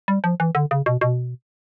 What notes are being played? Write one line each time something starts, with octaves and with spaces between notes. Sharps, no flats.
G3
F3
E3
D3
C#3
B2
B2